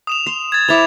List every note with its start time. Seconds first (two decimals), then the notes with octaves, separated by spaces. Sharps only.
0.07 D#6 E7 F7
0.26 C6
0.52 G#6 A6
0.68 E4 C5 D6 A6 F7